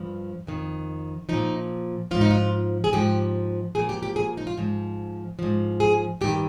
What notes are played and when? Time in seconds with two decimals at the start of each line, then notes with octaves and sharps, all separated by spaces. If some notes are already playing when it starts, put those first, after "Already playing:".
Already playing: G2 F3
0.47 F2 D#3
1.29 A#2 F3 D#4
2.11 G#2 F3 F4
2.21 D#4
2.30 F4
2.84 G#4
2.93 G#2 F3 G4
3.75 A#2 F3 G#4
3.89 G4
4.03 G4
4.16 G#4
4.37 D#4
4.47 F4
4.57 G#2 F3
5.39 G#2 F3
5.80 G#4
6.21 G2 D#3 G4